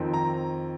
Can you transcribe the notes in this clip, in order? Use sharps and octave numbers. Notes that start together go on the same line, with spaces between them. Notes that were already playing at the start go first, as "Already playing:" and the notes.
Already playing: F2 D#3 C4
A#5